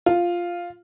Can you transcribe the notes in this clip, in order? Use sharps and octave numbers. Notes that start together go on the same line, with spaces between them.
F4